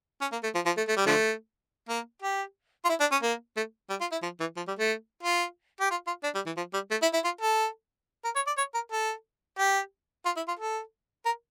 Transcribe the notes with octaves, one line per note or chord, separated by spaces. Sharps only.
C#4
A#3
A3
F3
F3
A3
A3
G3
D3 F3 A3
A#3
G4
F4
E4
D4
C#4
A#3
A3
G3
F4
E4
F3
E3
F3
G3
A3
F4
G4
F4
F4
D4
G3
E3
F3
G3
A3
E4
E4
F4
A4
A#4
C#5
D5
C#5
A#4
A4
G4
F4
E4
F4
A4
A#4